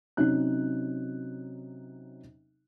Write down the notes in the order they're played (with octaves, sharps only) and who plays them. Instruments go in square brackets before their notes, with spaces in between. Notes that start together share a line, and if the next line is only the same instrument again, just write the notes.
[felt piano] C3 F#3 C#4 D#4 F#6